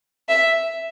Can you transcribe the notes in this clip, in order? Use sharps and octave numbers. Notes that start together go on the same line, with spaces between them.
E5